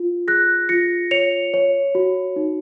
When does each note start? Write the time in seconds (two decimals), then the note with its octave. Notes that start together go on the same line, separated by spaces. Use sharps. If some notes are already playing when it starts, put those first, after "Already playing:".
Already playing: F4
0.28 G#4 F#6 A#6
0.69 F4 A#6 C#7
1.11 C#5 C#7 F7
1.54 C#5
1.95 F#4
2.36 D#4